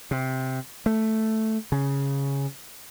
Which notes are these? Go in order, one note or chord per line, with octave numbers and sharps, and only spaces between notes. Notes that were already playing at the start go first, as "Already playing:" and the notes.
C3
A3
C#3